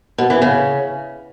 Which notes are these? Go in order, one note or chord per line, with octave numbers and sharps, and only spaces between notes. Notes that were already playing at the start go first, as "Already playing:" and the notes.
B2
E3
C#3